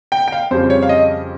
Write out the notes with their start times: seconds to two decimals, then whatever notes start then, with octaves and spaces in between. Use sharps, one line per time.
0.12 G5
0.28 G5
0.32 F5
0.51 F2 C#3 G3 C5
0.70 C#5
0.83 F5
0.89 D#5